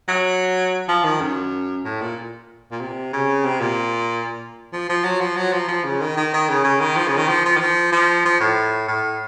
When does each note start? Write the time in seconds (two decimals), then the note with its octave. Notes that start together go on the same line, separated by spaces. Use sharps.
0.08 F#3
0.88 F3
1.05 D#3
1.21 F#2
1.85 A2
2.01 A#2
2.72 A#2
2.81 C3
3.13 C#3
3.45 C3
3.61 A#2
4.73 F3
4.90 F3
5.04 F#3
5.20 F3
5.37 F#3
5.53 F3
5.68 F3
5.84 C#3
6.01 D#3
6.17 D#3
6.34 D#3
6.49 C#3
6.64 C#3
6.80 D#3
6.97 F3
7.08 C#3
7.18 D#3
7.29 F3
7.46 F3
7.57 D#3
7.60 F3
7.92 F3
8.25 F3
8.40 A2
8.88 A2